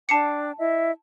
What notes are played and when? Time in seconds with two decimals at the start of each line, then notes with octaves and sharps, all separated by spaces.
0.09 D4 G5 A5 D6 C7 C#7
0.58 E4 D#5 E5